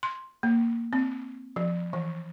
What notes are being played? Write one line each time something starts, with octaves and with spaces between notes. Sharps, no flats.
C6
A#3
C4
F3
E3